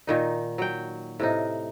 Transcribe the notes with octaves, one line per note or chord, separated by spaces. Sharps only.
A#2 D#3 D#4
F#3 G5
A2 C3 D#4